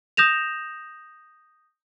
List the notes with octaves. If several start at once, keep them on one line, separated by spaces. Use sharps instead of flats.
D#6 G6 A#6 E7 F7